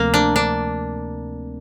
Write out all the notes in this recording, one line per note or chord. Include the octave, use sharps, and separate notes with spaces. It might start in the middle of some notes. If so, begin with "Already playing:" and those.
Already playing: D2 C3 F3 A3 A#3 C4
D4
D4